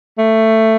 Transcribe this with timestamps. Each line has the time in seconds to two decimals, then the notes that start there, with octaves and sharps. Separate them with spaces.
0.18 A3